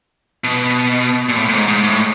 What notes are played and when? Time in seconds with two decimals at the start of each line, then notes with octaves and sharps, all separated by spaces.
0.44 B2
1.29 A#2
1.37 A2
1.49 A2
1.53 G#2
1.68 G#2
1.84 A2